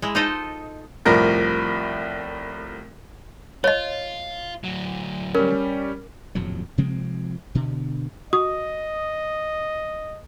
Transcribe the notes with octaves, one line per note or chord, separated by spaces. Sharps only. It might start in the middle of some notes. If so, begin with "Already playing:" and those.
G#3 E4
D#4 F4 A4 C5 D#5
C2 A2 F3 A#4 A#6
F4 C#5 D#5
D2 F#3
G3 C#4 A#4
D#1 F2 A2 F#3
C3 F3 G#3 C4
B2 D3
F#4 D#5 D#6